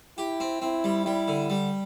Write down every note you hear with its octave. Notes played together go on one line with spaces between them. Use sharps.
E4 G4
C4
C4 E4
G3
G3 E4
D3
G3